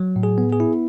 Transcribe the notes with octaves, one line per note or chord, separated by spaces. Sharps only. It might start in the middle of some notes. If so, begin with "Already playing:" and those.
Already playing: F#3
A2
G#4
B3
G#4
E4